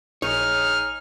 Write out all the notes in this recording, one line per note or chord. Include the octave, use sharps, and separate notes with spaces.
A#1 D#4 G#4 C#5 F6